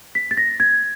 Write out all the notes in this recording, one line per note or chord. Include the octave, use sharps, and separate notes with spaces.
B6
A6
A#6
G#6